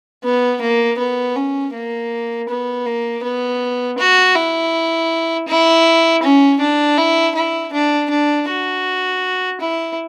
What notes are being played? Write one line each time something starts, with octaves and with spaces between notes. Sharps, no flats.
B3
A#3
B3
C#4
A#3
B3
A#3
B3
F#4
E4
E4
C#4
D4
E4
E4
D4
D4
F#4
E4